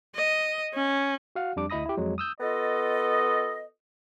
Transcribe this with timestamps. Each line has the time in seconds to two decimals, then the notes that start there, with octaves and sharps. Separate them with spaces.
0.15 D#5
0.74 C#4
1.36 F#4 F5 F#5
1.56 F2 G3 D4 D6
1.70 D2 E4 D#5 B5 D#6 A#6
1.85 E4 G4
1.97 F2 F#3 G#3
2.18 D#6 E6 G6
2.40 B3 F4 A4 D#5